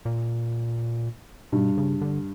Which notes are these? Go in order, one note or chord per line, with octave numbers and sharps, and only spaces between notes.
A#2
G2 B2
C#3
D3